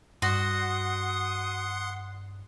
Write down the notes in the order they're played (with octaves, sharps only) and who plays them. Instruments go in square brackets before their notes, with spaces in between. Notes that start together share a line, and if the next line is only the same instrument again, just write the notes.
[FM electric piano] G2 [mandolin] F#4 [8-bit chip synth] F#5 C6 [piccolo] D#6